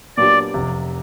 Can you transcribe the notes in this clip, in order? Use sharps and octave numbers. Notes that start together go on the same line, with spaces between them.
A#2 F#3 B3 D4 G4 D5
F1 F2 C3